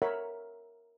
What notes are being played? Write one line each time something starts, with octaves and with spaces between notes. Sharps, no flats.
A#4 C#5 E5 F#5 B5